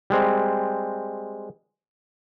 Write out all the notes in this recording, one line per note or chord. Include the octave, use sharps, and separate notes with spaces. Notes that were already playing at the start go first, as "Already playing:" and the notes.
G3 G#3 C4